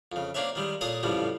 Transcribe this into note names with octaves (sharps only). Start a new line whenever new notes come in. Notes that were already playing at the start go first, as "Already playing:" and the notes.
F2 C#3
A#3 C4 D4 C#5 E5
D#3 G3 G#3
A#2 G#4 A4 C#5 D#6
A1 F2 C#3 F3 G3